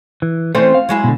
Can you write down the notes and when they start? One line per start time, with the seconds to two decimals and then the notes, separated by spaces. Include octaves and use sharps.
0.22 E3
0.55 E3 A3 C4 C#4 C5
0.74 F5
0.89 F#3 G#3 E4
1.04 B2 D3